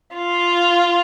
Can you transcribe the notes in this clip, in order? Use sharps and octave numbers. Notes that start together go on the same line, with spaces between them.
F4